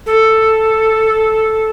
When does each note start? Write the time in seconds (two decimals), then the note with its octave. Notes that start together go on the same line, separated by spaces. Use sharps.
0.06 A4